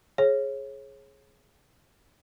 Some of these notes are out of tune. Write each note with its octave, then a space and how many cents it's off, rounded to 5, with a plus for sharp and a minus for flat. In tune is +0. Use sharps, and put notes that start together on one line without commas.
G#4 +15 C#5 -30